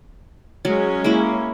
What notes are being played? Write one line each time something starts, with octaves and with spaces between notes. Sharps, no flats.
F#3 G#3 C#4
A#3 E4